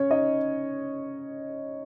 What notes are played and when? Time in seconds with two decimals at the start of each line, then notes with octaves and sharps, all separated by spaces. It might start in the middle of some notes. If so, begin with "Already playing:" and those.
Already playing: C#4 C#5
0.11 D#4 D#5